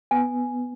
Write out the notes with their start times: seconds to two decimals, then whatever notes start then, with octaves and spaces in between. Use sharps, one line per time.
0.11 B3 G#5